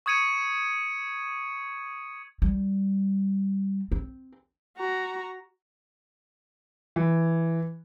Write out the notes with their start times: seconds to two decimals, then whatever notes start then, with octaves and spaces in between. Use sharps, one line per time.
0.06 C#6 D#6 G#6 C#7 D#7
2.42 G3
3.92 C4
4.77 F#4 A#5
6.96 E3